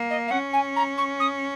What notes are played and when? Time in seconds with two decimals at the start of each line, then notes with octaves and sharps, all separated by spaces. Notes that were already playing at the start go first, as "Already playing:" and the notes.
Already playing: A#3
0.10 D#5
0.28 F5
0.31 C#4 F#5
0.53 G#5
0.76 A#5
0.98 C#6
1.20 D#6